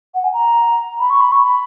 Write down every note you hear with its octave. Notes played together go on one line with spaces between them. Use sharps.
F#5
G#5
A#5
B5
C#6
B5
C#6
B5